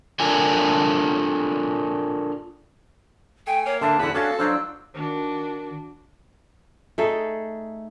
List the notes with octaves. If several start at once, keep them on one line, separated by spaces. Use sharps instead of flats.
D4 F4 A4 A#4 G#5
A3 G5 G#5
A#3 C#5
D3 D4 E5 A5
E2 D3 B4 F#5
C#4 D4 F#4 A4 F5
F#3 D4 F4 C5 E6
D#3 D4 F#4
A3 D#4 G#4 A4